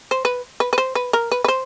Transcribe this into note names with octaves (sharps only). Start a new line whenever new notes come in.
C5
B4
B4
B4
C5
B4
A#4
B4
B4
C5